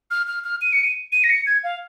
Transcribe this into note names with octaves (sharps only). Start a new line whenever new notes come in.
F6
F6
F6
D#7
C#7
D#7
D#7
A#6
C#7
G#6
F5